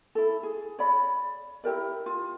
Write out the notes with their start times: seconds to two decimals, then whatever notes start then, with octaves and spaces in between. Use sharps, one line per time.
0.15 E4 A4
0.43 G#4
0.79 C#5 D5 B5
1.64 E4 G4 A#4 D5
2.06 F4